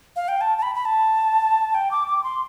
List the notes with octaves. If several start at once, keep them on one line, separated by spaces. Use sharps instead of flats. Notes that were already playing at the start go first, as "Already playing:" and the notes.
F5
G5
A5
A5
B5
B5
A5
G5
D6
D6
C6